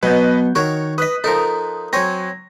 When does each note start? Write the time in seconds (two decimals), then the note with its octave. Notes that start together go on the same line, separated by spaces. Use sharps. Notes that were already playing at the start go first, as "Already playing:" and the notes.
0.03 B2 F#3 B3 B4 D#5 G6
0.55 D#3 F#4 A#4 C#5 C#6
0.98 B4 D#5 D#6 F#6 B6
1.24 F3 D#4 A4 A#4
1.93 F#3 C4 C#5 G#5 A#6